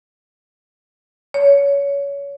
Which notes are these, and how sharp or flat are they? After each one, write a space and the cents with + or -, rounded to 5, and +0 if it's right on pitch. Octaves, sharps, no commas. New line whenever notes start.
C#5 +25